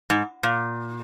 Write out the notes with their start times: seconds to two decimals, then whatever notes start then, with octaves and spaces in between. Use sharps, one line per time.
0.10 G#2
0.43 A#2